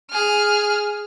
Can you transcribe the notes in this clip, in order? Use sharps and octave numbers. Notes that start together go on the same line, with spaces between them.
G#4 F6